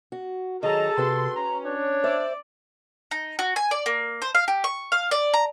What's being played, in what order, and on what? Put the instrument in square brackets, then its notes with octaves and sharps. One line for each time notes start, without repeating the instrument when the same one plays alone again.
[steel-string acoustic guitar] F#4
[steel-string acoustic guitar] D#3 F#3 [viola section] G#4 A5 A#5 [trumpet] A4 [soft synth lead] D#5
[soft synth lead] C3 [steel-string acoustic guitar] F#4 B4 G5 [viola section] C6
[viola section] C#4 [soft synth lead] A#5
[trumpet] D4 [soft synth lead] C#5
[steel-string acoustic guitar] C5 E5 [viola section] D5
[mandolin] D#4
F#4
G#5
D5
A#3
C5
F5
G4
C#6
F5
D5
A#5